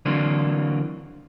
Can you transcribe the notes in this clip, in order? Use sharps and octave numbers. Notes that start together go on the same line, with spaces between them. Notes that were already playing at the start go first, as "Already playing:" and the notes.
D3 E3 F#3 A#3 C4 D4